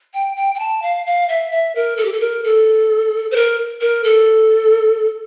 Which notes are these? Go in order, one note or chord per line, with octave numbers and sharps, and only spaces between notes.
G5
G5
G5
A5
F5
F5
E5
E5
A#4
A4
G4
A4
A#4
A4
C5
A#4
A#4
A4